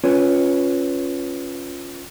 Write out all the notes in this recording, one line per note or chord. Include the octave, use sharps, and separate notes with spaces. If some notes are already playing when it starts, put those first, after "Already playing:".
C#4 F4 B4 C#5